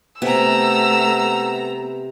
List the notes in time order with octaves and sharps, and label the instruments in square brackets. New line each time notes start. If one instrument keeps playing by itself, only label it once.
[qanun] C3 G#5 [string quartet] A3 A#5 [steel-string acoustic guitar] B3 [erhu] E6